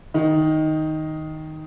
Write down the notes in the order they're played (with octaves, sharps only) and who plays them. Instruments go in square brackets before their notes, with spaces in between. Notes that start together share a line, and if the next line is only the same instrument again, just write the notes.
[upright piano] D#3 D#4